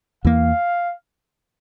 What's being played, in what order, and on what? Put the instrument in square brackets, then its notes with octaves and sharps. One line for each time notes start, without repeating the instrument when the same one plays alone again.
[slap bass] E2 E3 A#3 [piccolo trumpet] F5